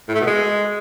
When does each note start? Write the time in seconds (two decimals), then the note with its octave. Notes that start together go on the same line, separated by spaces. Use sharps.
0.08 A2
0.15 A3
0.21 B2
0.27 G#3